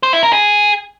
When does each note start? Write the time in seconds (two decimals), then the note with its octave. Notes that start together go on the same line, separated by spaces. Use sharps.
0.03 C5
0.13 E4
0.23 A#4
0.33 G#4